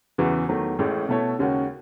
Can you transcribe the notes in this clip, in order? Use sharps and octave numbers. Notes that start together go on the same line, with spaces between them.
E2 C#3 E3 B3 F#4
E2 D#3 F#3 A3
A1 A2 G#3 C#4
B2 A3 E4 A4 C#5
D#2 C#3 G#3 C#4 F#4